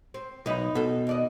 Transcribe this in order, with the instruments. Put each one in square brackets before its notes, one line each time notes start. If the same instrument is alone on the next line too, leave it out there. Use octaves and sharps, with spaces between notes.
[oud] C4
[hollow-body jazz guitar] B1 [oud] D#4 E4 B4
[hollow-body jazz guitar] B2 A4
[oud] D#2 D5 D#5